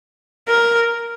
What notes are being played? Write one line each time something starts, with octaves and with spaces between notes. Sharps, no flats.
A#4